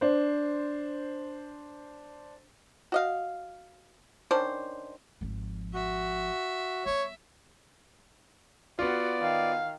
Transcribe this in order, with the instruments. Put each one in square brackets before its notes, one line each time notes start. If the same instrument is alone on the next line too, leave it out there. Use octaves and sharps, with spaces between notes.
[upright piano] D4 C5
[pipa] F#4 D#5 F5
D#3 C#4 D4 C5
[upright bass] G#1 F3
[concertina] F#4 [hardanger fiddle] E5
[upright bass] G3 B3 [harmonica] C#5
[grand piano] B3 F4 [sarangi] F#4 [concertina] D5
[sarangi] D#3 [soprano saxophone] F5